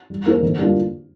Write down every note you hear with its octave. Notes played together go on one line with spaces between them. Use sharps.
G3
A#3 D#4 G#4 C5
D3
G3 A#3 D4 F4